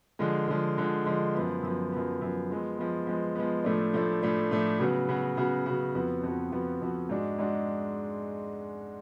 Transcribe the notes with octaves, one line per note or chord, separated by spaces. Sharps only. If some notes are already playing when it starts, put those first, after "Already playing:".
D3 F3 G#3
D3 F3 G#3
D3 F3 G#3
D3 F3 G#3
F#2 F3 B3
F#2 F3 B3
F#2 F3 B3
F#2 F3 B3
F3 G#3 B3
F3 G#3 B3
F3 G#3 B3
F3 G#3 B3
A2 F3 A3 D4
A2 F3 A3 D4
A2 F3 A3 D4
A2 F3 A3 D4
C#3 F#3 B3 F#4
C#3 F#3 B3 F#4
C#3 F#3 B3 F#4
C#3 F#3 B3 F#4
F2 F3 B3 F#4
F2 F3 B3 F#4
F2 F3 B3 F#4
F2 F3 B3 F#4
G#2 G#3 D4 F#4
G#2 G#3 D4 F#4